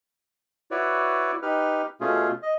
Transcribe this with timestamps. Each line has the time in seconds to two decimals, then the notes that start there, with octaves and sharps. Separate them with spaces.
0.71 E4 F#4 B4 C#5 D5
1.42 D#4 G4 B4 F6
2.01 B2 A3 C#4 F4 G#4
2.43 D#5